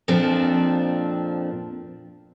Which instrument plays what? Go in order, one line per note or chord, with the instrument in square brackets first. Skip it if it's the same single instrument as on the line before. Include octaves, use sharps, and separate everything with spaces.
[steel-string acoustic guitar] F2 A#2 F3 C4 D4